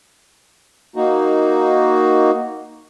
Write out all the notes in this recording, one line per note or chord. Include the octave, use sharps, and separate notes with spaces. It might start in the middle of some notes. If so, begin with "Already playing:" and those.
A#3 D#4 F#4